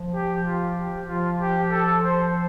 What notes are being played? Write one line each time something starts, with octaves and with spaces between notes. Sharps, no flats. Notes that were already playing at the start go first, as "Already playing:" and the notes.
Already playing: F3
G4
F4
G4
F3 F4
G4
A4
C5